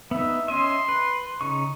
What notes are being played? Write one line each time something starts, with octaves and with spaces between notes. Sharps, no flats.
B3 D#4 E5
C#4 D#5 E5 C6
B4
C#3 D#4 C#6